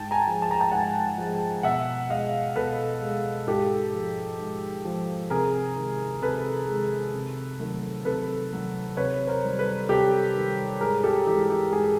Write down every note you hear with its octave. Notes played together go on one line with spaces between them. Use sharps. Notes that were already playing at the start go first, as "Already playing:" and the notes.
Already playing: G#2 G5 A5
G#5 A#5
F3 G#3
A5
A#5
G5 A5
G#2 F#5 G#5
F3 G#3
B2 E5 F#5
G#3 D#5 F5
B2 A4 B4
G#3
G#2 G4 A4
F3 G#3
G#2
F3 G#3
C3 G#4 A#4
D#3 G#3
C3 A4 B4
G#3
D#3
C3
D#3 F#3 A3
C3 A4 B4
D#3 F#3 A3
C3 B4 C#5
A#4 C5
D#3 G3
A4 B4
C3 G4 A4
D#3 G3
G#2 G#4 A#4
G4 A4
E3 G#3 G4
G4
G#2 G#4